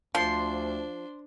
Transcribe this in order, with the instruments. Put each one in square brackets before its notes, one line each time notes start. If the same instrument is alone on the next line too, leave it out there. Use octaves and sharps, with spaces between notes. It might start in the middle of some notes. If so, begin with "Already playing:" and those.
[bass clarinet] D2 [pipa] F3 [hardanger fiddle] D4 C5 [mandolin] C6